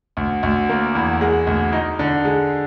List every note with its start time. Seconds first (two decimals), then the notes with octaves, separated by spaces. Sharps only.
0.17 D2
0.43 D2
0.69 A#3
0.95 E2
1.21 G#3
1.47 D2
1.72 D#4
1.99 D3
2.25 G#3